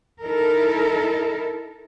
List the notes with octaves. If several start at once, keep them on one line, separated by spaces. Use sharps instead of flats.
D#4 E4 A4 A#4